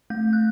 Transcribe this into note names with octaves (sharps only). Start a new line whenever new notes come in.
A3 G6
F#6